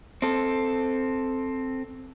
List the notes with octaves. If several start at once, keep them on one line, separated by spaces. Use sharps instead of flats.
C4 A4